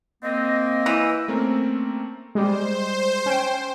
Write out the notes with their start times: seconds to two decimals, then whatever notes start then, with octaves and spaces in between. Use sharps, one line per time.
0.23 A#3 C4 D#5
0.86 E3 E6
1.28 A3 A#3 C4 C#4 A#4
2.35 G3 G#3 C5
3.26 C#4 G5